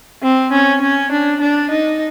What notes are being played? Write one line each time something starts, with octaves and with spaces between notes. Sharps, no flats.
C4
C#4
C#4
D4
D4
D#4